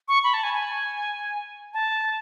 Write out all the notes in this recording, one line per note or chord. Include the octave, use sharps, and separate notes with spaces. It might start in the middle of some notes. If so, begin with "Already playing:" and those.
C#6
B5
A5
G#5
G#5
A5